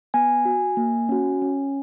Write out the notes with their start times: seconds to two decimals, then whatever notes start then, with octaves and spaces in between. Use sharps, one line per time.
0.14 B3 G#5
0.45 F#4
0.77 A#3
1.09 C#4 F#4
1.42 C#4